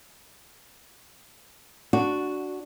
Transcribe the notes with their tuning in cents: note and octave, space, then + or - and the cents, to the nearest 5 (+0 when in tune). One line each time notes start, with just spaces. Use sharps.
D4 +0 F#4 +0